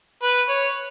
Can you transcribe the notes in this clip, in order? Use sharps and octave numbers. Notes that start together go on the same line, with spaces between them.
B4
C#5